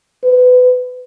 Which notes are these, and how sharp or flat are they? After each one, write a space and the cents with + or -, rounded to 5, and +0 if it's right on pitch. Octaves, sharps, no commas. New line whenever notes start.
B4 +25